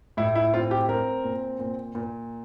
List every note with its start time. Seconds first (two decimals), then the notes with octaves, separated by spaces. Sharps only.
0.17 A2 E4
0.35 E4
0.54 C4 F4
0.71 G4
0.89 C4 A#4
1.24 A#2
1.60 A#2
1.95 A#2